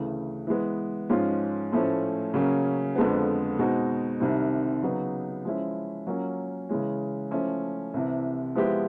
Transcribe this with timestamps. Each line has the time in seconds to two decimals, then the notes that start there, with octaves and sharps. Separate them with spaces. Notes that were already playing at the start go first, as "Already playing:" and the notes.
Already playing: D2 C#3 E3
0.47 E3 G#3 B3
1.10 G#2 F3 G#3 C#4 F4
1.72 A2 F3 A3 C#4
2.34 C#3 F#3 A#3 C#4
2.96 F2 D3 F3 G#3 B3
3.59 B2 G#3 C4 D#4 F#4
4.20 C2 C3 D#3 G3 C4
4.83 C#3 F#3 B3 D#4
5.45 F3 G#3 C#4 E4
6.07 F#3 A#3 C#4 F4 A#4
6.69 C#3 E3 G#3 C#4
7.31 F3 A3 C#4 E4
7.94 C2 C3 E3
8.55 F3 G#3 B3 E4 G4